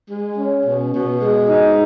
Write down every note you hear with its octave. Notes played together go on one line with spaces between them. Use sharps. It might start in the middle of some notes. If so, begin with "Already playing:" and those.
G#3
C#4
B2
B2
G#3
D#4